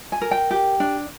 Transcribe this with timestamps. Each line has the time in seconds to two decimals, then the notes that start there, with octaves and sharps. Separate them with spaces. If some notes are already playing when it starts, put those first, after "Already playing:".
0.12 G#5
0.21 A#4
0.31 G5
0.51 G4
0.80 D4